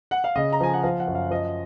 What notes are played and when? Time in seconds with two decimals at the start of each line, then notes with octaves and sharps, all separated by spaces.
0.11 F#5
0.24 F5
0.36 C#3 D#5
0.52 A#5
0.60 F3 G#5
0.74 F#5
0.83 F3 F5
1.00 F#5
1.07 F#2
1.15 F5
1.31 F3 D#5